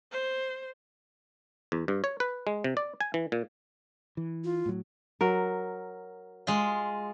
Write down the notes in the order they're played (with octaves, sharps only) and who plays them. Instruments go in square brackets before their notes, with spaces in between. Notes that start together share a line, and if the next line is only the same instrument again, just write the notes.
[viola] C5
[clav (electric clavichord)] E2
G2
C#5
B4
G#3
C3
D5
G#5
E3
A#2
[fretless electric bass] E3
[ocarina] F4
[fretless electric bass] A2 F#3
[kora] F#3 A#4
[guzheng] G#3 F4